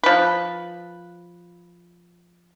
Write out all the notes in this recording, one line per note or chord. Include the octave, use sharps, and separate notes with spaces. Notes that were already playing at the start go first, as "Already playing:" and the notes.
F3 B4